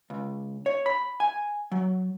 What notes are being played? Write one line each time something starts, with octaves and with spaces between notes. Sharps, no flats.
C#2
C#5
B5
G#5
F#3